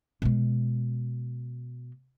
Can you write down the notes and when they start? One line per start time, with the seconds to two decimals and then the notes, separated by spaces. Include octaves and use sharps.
0.22 B2 G#3